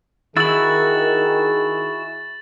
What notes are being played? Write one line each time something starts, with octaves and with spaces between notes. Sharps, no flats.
D#3 E4 F#4 G#4 E6 A6 F#7